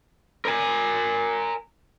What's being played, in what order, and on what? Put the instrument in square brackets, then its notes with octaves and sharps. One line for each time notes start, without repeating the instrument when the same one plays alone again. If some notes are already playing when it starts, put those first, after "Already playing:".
[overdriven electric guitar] A#4 G#5